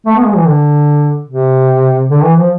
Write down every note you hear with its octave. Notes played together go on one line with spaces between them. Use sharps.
A3
B3
G#3
E3
D3
C3
D3
E3
F3